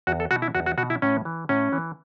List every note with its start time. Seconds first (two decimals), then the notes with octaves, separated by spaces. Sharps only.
0.07 E2 F#4
0.20 A4
0.31 B2 F#4
0.42 E4
0.55 E2 F#4
0.66 F#4
0.78 B2 F#4
0.90 E4
1.02 A2 C#4
1.25 E3
1.49 A2 C#4
1.73 E3